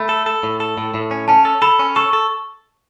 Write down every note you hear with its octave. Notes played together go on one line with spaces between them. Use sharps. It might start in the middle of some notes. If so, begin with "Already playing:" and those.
Already playing: A3 B5
A4
A4
A2
A4
A2
A2
C#4
C#4 A5
A4
A4 B5
C#4
A4 C#6
A4